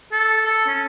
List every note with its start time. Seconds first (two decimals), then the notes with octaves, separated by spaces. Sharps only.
0.12 A4
0.45 A4
0.67 C#4